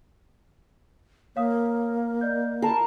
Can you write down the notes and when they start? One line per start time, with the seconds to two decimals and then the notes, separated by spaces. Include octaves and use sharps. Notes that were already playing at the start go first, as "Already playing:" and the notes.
1.36 A#3 C#5 F5 D#6
2.21 D5 D#5 G6
2.62 A#4 A5 B5 C7